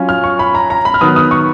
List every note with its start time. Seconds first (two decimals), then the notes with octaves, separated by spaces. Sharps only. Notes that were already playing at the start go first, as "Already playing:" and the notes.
Already playing: F#3 C#4 F4
0.09 F6
0.24 C#6
0.39 B5
0.55 A#5
0.70 A#5
0.85 B5
0.94 F6
1.01 D#3 F#3 B3 D#6
1.16 D#6
1.31 C#6